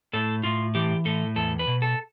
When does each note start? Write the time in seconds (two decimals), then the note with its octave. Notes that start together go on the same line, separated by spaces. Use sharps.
0.13 A2 A4
0.43 A2 F4
0.75 E3 G4
1.05 A2 A4
1.36 E2 A4
1.59 B4
1.67 B2
1.82 A4